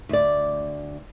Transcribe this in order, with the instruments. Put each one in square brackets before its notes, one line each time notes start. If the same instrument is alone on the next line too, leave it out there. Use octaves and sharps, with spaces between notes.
[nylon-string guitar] D2 D5